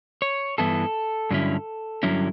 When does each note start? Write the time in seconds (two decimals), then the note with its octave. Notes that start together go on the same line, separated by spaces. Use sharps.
0.22 C#5
0.58 G2 E3 B3 E4 A4
1.31 G2 D3 F#3 C#4 E4
2.03 G2 D3 F#3 C#4 E4